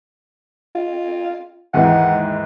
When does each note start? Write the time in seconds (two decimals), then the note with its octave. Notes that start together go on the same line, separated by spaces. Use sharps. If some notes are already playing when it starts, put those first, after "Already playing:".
0.75 F4
1.74 D#2 G#2 E3 F#5